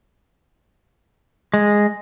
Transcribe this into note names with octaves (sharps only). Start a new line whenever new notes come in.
G#3